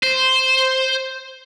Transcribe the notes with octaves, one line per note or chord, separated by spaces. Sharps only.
C5